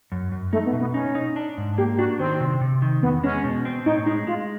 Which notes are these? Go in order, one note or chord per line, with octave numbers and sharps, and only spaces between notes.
F#2
F#2
A3 D#4
B3
B2
B3
C#4 D#4
D#4
D4
G#2
A#3 G4
D4 F#4
D#3 C4
C3
C3
D#3
E2 B3
G#3 C#4
B2
C4
A2 D#4
G#3 D#4
G#3 F4